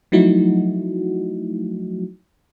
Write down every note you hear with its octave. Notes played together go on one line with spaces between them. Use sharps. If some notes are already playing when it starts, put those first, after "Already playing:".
F3 F#3 A3 D#4 E4 F#4